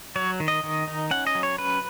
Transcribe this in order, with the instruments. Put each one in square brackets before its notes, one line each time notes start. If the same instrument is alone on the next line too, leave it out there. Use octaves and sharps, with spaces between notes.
[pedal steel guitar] F#3 C#5
D#3
D#5
D#3
D#4
C#4 F#5
D#5
F#3
C#5
C#4 B4